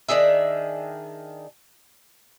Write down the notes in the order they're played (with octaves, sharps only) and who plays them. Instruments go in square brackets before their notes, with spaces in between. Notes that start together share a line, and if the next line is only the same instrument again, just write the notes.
[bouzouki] D#3 D4 G#4 E5